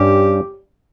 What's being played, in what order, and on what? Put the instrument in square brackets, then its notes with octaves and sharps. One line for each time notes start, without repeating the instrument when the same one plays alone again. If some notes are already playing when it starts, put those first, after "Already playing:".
Already playing: [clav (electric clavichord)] G2 G3 C#4 [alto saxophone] G4